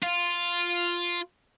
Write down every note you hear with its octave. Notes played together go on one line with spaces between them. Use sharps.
F4